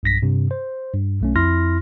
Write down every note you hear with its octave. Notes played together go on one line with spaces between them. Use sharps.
B1 G2 A#6 B6
G2 C3
C5
G2
B1 A3 C#4
F2 E4 C6 F6 A#6